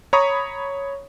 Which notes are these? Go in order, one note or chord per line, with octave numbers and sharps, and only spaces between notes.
C#5 A#5 B5 C#6 D#6